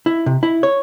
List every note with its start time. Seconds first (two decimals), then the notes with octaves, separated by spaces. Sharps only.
0.06 E4
0.26 C3
0.43 E4
0.63 C#5